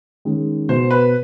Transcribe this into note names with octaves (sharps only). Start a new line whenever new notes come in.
D#3 G#3 C#4
B2 C5
B4